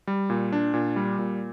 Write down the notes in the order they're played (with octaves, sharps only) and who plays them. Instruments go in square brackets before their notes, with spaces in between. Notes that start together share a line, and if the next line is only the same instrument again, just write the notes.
[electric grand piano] G3
A#2
D4
A#2
G3
A#2